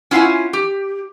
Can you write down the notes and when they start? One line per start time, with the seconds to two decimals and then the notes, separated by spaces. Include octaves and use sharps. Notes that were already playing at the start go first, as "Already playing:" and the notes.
0.11 C#4 E4 F4 F5 F#5 G#5
0.53 G4